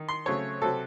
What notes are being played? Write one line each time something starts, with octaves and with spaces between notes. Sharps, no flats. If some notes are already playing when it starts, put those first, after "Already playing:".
Already playing: D#3
C6
C#3 F#3 A3 C4 C#5
C3 F#3 C4 A4